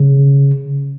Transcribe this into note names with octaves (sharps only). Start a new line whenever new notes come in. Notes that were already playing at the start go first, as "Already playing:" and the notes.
Already playing: C#3